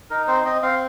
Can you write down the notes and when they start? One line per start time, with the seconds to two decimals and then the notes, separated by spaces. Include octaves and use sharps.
0.10 D#4 A#4
0.28 C4 C5
0.45 C4 D#5
0.63 C4 F5